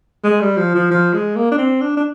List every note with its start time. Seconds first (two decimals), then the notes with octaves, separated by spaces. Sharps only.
0.23 G#3
0.41 G3
0.57 F3
0.74 F3
0.91 F3
1.13 G#3
1.36 A#3
1.51 D4
1.58 C4
1.81 D4
1.97 D4